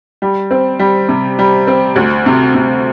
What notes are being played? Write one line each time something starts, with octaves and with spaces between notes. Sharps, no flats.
G3
C4
G3
C3
G3
C4
D2
C3
C3